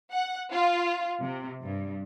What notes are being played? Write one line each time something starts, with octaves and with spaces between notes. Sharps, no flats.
F#5
F4
C3
G2